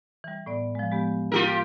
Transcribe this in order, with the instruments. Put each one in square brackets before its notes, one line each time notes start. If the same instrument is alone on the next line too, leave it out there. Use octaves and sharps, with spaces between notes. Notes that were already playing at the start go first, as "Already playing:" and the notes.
[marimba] E3 G3
A2 B3 D5
F3 G#3
G#3 B3 G4
[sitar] F4 G4 A#4 [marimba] E6